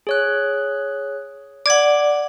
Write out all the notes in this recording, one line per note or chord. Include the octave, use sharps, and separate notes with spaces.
G#4 C#5 F#6
D5 F#5 D6 G#6